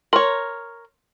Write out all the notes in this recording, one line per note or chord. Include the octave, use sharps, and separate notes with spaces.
A#4 C#5 C6